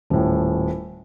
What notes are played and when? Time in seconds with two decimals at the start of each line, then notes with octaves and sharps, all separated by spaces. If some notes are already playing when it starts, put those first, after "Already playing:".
0.10 D#1 A2